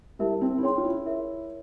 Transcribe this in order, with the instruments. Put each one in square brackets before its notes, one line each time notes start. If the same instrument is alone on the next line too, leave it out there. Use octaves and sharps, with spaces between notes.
[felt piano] G3 [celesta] E4 A#4 E5
[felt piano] C4
E4
[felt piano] C#4 [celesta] G#4 C#5 G5 C6
[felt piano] F4
E4
[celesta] A#4 C#5 E5